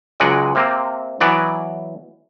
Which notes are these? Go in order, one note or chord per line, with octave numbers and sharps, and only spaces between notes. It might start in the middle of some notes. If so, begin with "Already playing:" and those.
C#2 F#3 G#3 D5 F#5 G#5
C3 A#3 C4
E3 F#3 B3 D5